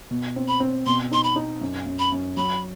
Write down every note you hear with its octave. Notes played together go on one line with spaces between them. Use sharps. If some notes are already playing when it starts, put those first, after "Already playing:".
B2
C4
B5
C4
B2 C6
D#4 C6
B5
D#4
F#2
F#2
B5
F#2
F#3 B5